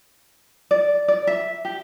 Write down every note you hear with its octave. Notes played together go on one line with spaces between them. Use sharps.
D5
D5
E5
G4